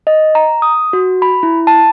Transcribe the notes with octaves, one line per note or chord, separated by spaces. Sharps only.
D#5
A#5
D#6
F#4
B5
E4
A5